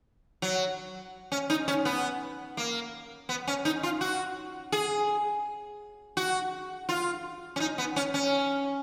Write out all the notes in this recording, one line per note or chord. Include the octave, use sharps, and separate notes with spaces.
F#3
C#4
D#4
C#4
B3
A#3
B3
C#4
D#4
F4
F#4
G#4
F#4
F4
C#4
D#4
B3
C#4
C#4